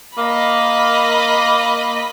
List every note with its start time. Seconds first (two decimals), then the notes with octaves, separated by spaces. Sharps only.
0.18 A#3 D#5 B5